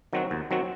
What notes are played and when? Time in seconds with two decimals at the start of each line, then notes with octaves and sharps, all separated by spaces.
0.13 D#3 F#3 C4 F#4
0.31 D#2
0.51 D#3 F#3 C4 F#4